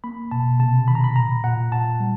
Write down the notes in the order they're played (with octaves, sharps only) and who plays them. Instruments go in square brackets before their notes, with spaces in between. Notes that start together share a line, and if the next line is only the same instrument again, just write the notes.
[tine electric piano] A#3 B5
B2 A5
C3 A5
D#3 B5
A#5
B5
A#2 A#5
A#2 F#5
A#2 A5
G3